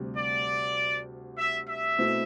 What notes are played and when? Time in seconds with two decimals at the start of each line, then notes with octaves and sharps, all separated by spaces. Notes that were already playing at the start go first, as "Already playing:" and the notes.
Already playing: D2 C3 G3
0.16 D5
1.38 E5
1.67 E5
1.98 B2 A3 C4 E4